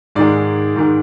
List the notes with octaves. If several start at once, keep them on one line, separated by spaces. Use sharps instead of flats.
G#2 D#3 G#3 D5
G#2 D#3 G#3